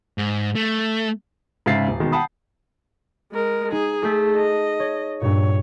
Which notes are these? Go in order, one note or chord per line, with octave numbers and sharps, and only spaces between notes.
G#2
A3
G#2 C#3 E5 F5 A6 C7
D#1
B2 D#3 G#3 B3
F#5 G5 A5 B5 D#6
G#3 A#4
D#4 G#4
A3 G#4 G6 B6
D#5 A5
C#5
G2 A#2 C#5